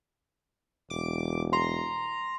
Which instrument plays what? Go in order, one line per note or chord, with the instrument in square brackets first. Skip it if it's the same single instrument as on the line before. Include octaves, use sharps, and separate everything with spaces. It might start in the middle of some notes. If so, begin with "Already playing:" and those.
[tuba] E1 [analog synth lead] D6
[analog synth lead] A#5 [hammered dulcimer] C6